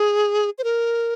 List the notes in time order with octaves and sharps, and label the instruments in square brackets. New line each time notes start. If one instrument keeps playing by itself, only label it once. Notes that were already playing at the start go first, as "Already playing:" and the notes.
Already playing: [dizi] G#4
C5
A#4